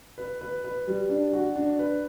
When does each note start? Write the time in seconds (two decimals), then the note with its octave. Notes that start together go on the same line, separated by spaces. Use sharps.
0.18 B4
0.41 B4
0.64 B4
0.87 G3
1.09 D4
1.33 F#4
1.56 D4
1.79 B4